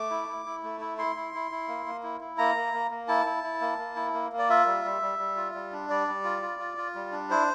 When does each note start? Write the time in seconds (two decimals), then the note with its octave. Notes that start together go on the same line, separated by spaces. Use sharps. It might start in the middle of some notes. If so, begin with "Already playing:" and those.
Already playing: A3 D6
0.10 E4
0.28 E4
0.46 E4
0.63 A3
0.81 E4
0.98 E4 C6
1.16 E4
1.34 E4
1.51 E4
1.68 A#3
1.86 A#3
2.03 E4
2.20 E4
2.38 A#3 A#5
2.56 A#3
2.73 A#3
2.91 A#3
3.08 E4 A5
3.26 E4
3.43 E4
3.61 A#3
3.79 A#3
3.96 E4
4.14 A#3
4.32 A#3
4.38 D5
4.49 F4 E5
4.66 G3
4.85 G3
5.02 G3
5.19 G3
5.36 F4
5.54 G3
5.73 D4
5.90 G3 D5
6.08 G3
6.24 F4
6.42 F4
6.59 F4
6.77 F4
6.95 G3
7.12 D4
7.30 E4 C5